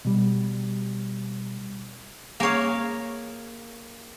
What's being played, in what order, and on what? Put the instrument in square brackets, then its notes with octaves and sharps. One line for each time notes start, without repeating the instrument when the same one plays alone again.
[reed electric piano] B2 G3
[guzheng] A#3 G#4 C#5 F5